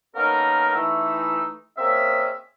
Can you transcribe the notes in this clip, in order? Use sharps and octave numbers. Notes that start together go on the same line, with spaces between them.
A#3 B3 C#4 D#4 A4 A#4
E3 A3 D#4 E6
A#3 C4 C#4 G#4 D#5 E5